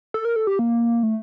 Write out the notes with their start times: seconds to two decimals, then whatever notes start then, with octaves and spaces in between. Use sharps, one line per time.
0.14 A4
0.25 A#4
0.36 A4
0.47 G4
0.59 A#3
1.03 A3